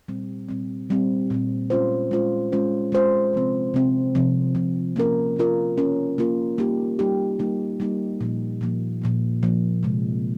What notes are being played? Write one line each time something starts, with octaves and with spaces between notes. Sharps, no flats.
A#2 G3 C4
A#2 G3 C4
A#2 G3 C4
A#2 G3 C4
G#3 C#4 F4 C5
G#3 C#4 F4 C5
G#3 C#4 F4 C5
G#3 C#4 F4 C5
C3 F3 C4
C3 F3 C4
C3 F3 C4
C3 F3 C4
A#3 C#4 F4 A#4
A#3 C#4 F4 A#4
A#3 C#4 F4 A#4
A#3 C#4 F4 A#4
G3 A#3 D#4 G4
G3 A#3 D#4 G4
G3 A#3 D#4 G4
G3 A#3 D#4 G4
A#2 F3 A#3
A#2 F3 A#3
A#2 F3 A#3
A#2 F3 A#3
C3 F3 G#3